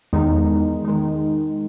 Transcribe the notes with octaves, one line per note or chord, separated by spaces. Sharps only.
E2 D#3 G#3 D#4
D#3 G#3 D#4